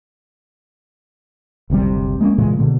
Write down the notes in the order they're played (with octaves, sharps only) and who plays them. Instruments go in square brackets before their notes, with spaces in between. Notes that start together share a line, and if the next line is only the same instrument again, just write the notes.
[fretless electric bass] F#1 D2 C3 G3
G#3 A#3 B3 C#4
A#2 C#3 E3 G#3
B2 D3 A#3